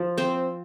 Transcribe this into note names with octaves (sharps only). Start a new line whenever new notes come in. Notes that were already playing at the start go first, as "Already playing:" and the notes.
Already playing: F3
C4 C5